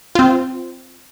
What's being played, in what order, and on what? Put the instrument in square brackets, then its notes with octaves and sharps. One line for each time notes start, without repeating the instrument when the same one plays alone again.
[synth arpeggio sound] C4 F4